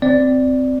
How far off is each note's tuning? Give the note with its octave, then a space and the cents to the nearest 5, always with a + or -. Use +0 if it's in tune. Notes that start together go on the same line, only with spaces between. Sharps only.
C4 -10 D5 +0